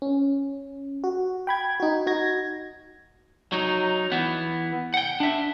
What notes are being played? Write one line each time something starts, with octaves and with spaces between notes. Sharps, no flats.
C#4
F#4
G5 B5 G#6
D#4 F#4
D#4 F#4 G#6 A#6
F#3 D#4
E3 B3
F#5 G5
D4 E5